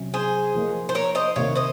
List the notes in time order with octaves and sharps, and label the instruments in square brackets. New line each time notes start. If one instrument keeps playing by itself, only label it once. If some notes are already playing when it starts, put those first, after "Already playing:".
Already playing: [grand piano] C3 F#3 C#4
[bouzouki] G#4 C5
[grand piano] F3 A#3 D#4
[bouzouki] C5
A#4 C#5
C5 D#5
[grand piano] C3 D#3 A#3 [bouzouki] C#5 F5
[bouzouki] C5 D#5